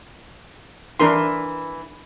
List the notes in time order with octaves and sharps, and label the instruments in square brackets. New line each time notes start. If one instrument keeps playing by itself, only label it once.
[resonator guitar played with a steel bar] E3 [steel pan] D4 A#4 C6